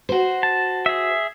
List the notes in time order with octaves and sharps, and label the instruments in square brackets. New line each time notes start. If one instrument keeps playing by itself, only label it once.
[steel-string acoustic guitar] F#4 C5
[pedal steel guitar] A5
G#4 E5